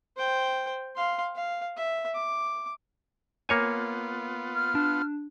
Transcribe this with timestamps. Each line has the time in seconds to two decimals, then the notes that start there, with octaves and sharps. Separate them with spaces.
0.17 C5 G5
0.96 F5 C6
1.35 F5
1.77 E5
2.14 D6
3.49 A#3 B3 F4 C#5 G#5
4.55 F6
4.75 D4